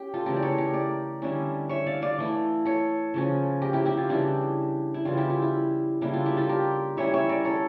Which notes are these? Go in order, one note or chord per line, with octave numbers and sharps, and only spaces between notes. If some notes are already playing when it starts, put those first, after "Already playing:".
Already playing: C#4 G4
F4 A4
C#3 E3 A3 G4 A#4
D5
A4 C#5
G4 A#4
A#4 D5
D3 G3 C#4 E4
C#5 E5
D5 F5
D5 F5
E3 A3 E4
A4 C#5
C#3 F3 C#4
G4 A#4
E4 G4
E4 G4
F4
C#3 E3 G3 D4 E4 G4
E4
C#3 E3 G3 F4
E4 G4
F4
E4
C#3 G3 A#3 D4 E4
F4
E4 G4
F4 A4
G4 A#4
G3 C#4 E4 C#5 E5
C#5 E5
A#4 D5
A4 C#5